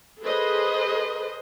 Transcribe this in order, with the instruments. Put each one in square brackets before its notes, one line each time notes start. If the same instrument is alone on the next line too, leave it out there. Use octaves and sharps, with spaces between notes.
[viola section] G#4 A4 B4 C5 D#5